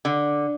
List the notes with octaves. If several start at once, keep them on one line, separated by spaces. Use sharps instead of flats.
D3